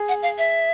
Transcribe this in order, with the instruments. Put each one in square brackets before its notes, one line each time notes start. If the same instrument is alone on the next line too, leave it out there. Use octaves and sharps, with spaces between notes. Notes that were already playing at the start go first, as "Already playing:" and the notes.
Already playing: [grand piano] G#4
[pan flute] F#5
F5
E5